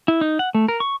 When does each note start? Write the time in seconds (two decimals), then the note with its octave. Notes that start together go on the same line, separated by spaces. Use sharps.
0.08 E4
0.21 D#4
0.39 F#5
0.55 A3
0.68 A#4
0.80 C#6